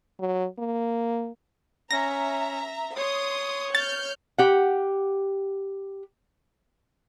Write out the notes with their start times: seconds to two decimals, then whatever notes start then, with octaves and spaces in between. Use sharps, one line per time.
0.19 F#3
0.59 A#3
1.91 C#4 E5 A#5 A#6
2.96 C#5 C6 D#6
3.75 F6 G6 A6
4.38 G4 F#5